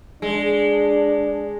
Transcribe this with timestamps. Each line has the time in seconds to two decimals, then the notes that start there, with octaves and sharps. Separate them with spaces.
0.22 G#3 D4